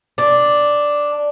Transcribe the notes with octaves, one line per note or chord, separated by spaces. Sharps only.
D4